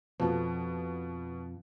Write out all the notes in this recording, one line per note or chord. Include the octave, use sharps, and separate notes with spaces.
F2 B2 F3